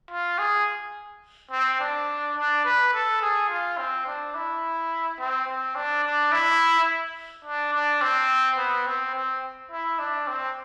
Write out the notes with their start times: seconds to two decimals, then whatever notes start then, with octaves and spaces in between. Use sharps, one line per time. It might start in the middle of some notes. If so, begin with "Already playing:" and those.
0.11 F4
0.39 G#4
1.52 C4
1.80 D4
2.37 D4
2.65 B4
2.93 A4
3.21 G#4
3.50 F4
3.78 C4
4.06 D4
4.34 E4
5.19 C4
5.47 C4
5.75 D4
6.04 D4
6.32 E4
7.45 D4
7.73 D4
8.01 C4
8.58 B3
8.86 C4
9.15 C4
9.71 E4
9.99 D4
10.27 C4